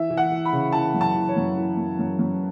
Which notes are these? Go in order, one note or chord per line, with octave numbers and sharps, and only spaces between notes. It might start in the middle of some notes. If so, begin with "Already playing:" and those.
Already playing: E3 E5
E3
F#5
E3
B5
C#3
E3 A5
F#2
A5
E3
C#5
F#2
E3
F#2
F#2
F#2